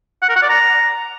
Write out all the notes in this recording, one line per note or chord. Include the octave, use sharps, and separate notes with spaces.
F#5
A#4
F#5
D5
A#5